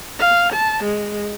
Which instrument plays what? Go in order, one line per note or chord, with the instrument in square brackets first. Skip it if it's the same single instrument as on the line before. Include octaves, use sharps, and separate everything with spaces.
[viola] F5
A5
G#3